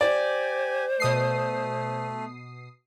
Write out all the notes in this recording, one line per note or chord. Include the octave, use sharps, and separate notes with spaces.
G4 C5 D5 G#5
B2 A3 D#6 C7